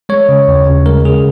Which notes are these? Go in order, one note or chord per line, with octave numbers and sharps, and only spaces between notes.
G#3 C#5
C#3
D#2
C#3
G#3 A#4
C#3 G#4